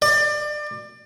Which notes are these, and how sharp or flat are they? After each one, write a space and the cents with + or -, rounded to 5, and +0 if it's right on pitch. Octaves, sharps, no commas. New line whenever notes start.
D5 +30